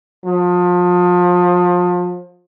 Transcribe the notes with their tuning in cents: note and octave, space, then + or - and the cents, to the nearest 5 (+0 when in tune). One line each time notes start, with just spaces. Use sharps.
F3 +30